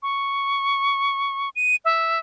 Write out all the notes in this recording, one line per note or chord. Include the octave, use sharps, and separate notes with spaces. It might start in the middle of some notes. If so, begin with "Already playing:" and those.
C#6
D#7
E5